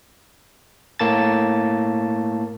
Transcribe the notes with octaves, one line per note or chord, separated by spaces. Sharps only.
A2 A#3 A5 A6